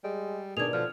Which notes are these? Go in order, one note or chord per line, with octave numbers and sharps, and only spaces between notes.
G3 G#3
B2 D#3 D4 G#4 G#6 F7
D3 F3 F6